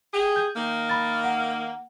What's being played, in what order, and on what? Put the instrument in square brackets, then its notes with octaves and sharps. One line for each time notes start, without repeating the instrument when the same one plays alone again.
[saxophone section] G4 G#4
[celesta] G6
[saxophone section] D#3 A#3
[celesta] B5 A6
F#5